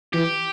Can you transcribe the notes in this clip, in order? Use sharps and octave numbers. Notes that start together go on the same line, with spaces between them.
E3 G4